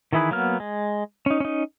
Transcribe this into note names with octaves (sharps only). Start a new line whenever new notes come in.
D#3 E3 E4 G#4 B4
F#3 A#3 B3 F6
G#3
C#4 D#4
C#4 D#4